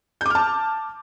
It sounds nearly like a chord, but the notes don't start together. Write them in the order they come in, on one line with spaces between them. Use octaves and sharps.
G6 D6 F6 A5